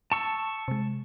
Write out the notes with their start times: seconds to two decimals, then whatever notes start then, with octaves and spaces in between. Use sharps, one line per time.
0.12 A5 C#6 E6
0.68 C3 G#3